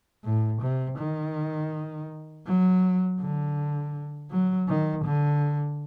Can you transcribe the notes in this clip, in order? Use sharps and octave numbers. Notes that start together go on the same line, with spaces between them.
A2
C3
D#3
F#3
D3
F#3
D#3
D3